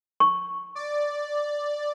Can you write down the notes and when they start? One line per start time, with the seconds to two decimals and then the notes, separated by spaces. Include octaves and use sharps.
0.20 C#6
0.75 D5